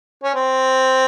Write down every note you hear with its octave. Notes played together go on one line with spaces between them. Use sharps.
C#4
C4